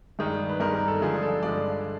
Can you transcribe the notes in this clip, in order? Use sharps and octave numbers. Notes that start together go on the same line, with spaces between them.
G2 D#3 G#3
B4
G2 D#3 G#3 A#4
A#4
A4
G2 D3 F3 G#3 G#4
A4
G2 D3 F3 G#3 D5